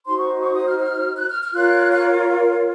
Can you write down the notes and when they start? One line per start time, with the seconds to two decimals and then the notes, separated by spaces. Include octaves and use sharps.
0.06 D#4 F#4 C5 C6
0.18 C#6
0.42 C#6
0.54 D#6
0.67 F6
0.79 F6
1.18 F#6
1.29 F6
1.43 F6
1.54 F4 A#4 C#5 F#6
1.91 F#6